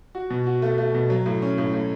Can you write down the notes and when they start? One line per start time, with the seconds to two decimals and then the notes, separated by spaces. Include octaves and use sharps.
0.15 F#4
0.30 B2
0.47 F#4
0.62 A3
0.78 A3
0.94 B2
1.10 F#3
1.26 A2
1.42 C#4
1.58 A2
1.73 A2